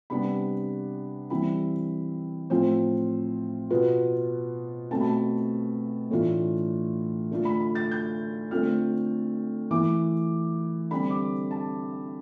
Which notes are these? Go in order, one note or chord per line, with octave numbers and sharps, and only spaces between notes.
C3 G3 B3 D4 B5
E3 G3 C4 E4 B5
A2 F3 C4 F4 C5
B2 B3 F4 B4
B2 A3 C4 A5
B5
A5
A2 E3 A3 D4 F4
D3 A3 D4 F4
B5
B5
A6
G6
D3 A3 C4 F4 F6
E3 A3 E4 D6
D3 G3 C4 B5
D6
A5